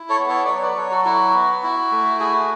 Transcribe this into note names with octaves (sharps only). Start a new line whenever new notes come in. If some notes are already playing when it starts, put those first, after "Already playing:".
Already playing: E4
A4 C#5
B3
A4 C#5
D5
F#3 A4 C#5
B4 D5
F#3 A4 C#5
F#4 A4
E4 F#4
B3
E4
A3
F#4 G#4